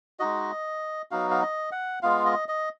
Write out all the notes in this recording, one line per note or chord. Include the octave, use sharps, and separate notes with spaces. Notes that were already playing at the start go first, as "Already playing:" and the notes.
G#3 D#4 F#4 D#5
F#3 B3 D#4 F#4 F5
F5
D#5
F#5
G#3 B3 F4 F5
D#5
D#5